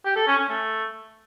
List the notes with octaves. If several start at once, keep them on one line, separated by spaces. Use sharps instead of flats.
G4
A4
C#4
C#4
A3